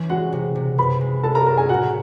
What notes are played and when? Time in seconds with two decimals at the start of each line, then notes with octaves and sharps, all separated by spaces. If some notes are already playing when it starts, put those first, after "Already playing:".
Already playing: E3 C#4
0.09 G#3 F#4 F#5
0.32 C3
0.55 C3
0.78 F#2 B4 B5
1.01 G#3
1.23 G#3 A4 A5
1.35 A#4 A#5
1.46 F#2 A#4 A#5
1.58 G#4 G#5
1.69 A2 F#4 F#5